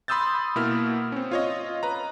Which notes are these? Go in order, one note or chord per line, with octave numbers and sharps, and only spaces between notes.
B5 C6 D#6 E6 G6 A6
B2 A#3 E4 E6 F6
C4 C#4
F4 C#5 D#5
B4 A#5